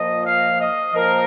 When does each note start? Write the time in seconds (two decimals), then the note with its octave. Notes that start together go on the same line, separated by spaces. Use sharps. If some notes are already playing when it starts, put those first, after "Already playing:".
Already playing: A#2 F3 D#5
0.25 F5
0.59 D#5
0.94 A#2 F3 A#4